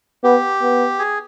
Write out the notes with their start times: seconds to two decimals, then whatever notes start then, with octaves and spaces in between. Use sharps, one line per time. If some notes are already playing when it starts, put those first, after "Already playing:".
0.24 B3 G4
0.62 B3
0.99 G#4